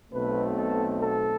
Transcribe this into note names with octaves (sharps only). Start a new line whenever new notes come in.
B1 B2 A3 C4 B4
A4
A4